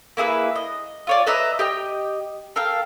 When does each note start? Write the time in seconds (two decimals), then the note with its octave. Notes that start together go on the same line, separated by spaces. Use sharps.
0.17 A#3 E4 G#4 B4
0.56 D#5
1.07 F4 C#5 D5
1.27 B4 D#5 E5 A#5
1.59 G4 D#5 G5
2.56 A4 A#4 F5 G5